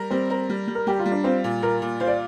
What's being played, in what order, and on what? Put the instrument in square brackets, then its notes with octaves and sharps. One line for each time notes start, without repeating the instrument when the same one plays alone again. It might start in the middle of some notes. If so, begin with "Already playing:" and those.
Already playing: [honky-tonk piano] G3 A#4
[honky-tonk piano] G3 [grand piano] C4
[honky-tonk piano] A#4
G3
G3
[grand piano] A#4
[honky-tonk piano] G3 [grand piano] G4
[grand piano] F4
[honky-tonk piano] G3
[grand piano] D4
[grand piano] C4 [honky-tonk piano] F4
[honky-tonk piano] A#2
[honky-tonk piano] A#2 [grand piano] A#4
[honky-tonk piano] A#2
[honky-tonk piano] F4 [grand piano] C5
[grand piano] D5